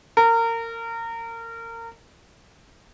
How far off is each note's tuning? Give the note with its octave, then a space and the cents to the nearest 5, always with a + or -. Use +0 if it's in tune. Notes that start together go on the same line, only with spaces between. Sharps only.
A#4 -25